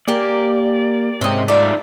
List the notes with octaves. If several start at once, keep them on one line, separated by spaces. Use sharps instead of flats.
A#3 G4 A#4 D5 G#5
G#2 C3 C#4 D#5 G5
A3 D#4 F4 D5 E5